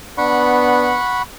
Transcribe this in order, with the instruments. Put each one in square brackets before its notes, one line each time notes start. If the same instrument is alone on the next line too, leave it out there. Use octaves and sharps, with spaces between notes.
[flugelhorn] B3 [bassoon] D4 [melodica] F#5 B5 C#6